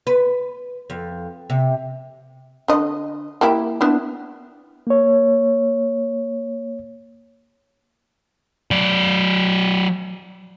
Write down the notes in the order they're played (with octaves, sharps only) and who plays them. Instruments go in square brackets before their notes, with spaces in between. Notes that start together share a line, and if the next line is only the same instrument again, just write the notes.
[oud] B4
F2
C3
[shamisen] D3 D#5
A#3 E4 G4
B3 D4 E4
[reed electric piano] A#3 C#5
[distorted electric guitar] F#3 D5